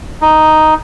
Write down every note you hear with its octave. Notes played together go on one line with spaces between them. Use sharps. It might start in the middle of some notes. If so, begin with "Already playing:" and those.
D#4